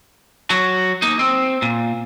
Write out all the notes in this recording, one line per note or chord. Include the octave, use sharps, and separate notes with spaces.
F#3 F#4
A#3 D#4
C4
A#2